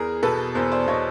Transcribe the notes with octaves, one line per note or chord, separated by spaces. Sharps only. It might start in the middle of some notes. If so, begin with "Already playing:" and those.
Already playing: E2 G#4 A#4
B2 A4 B4
E2 A#4 C5
C5 D5
B2 C#5 D#5